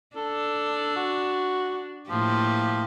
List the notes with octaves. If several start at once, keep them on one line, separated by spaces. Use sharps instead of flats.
D4 A4
F#4
A2 F3 A#3 G4